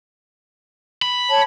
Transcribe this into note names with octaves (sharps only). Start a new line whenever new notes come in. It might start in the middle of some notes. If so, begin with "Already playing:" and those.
B5
C#5 A5